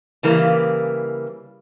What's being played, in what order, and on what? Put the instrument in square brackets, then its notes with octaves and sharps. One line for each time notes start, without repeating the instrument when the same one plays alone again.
[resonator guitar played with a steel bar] C#3 E3 G3 A#3